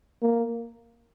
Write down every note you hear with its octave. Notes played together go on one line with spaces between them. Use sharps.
A#3